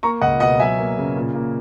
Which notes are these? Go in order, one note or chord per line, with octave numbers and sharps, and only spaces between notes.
A#3 A#5 C#6
C#2 D#5 F#5
B2 D#5 F#5
F#3 E5 G#5
A#3
C#3
A#2
A#3